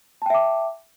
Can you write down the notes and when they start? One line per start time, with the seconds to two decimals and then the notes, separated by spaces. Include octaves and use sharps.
0.22 A5
0.26 G5
0.30 E5
0.34 D6